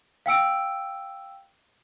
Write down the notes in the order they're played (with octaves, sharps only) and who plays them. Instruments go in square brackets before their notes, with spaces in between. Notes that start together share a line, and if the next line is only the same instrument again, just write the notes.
[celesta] F5 G5 E6 D7